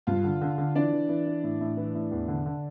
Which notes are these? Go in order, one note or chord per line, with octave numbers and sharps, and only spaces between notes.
G2 F4 F5
D3
D3
D3
E3 D4 D5
E3
E3
E3
A2
A2
E3
A2
E2
D3
D3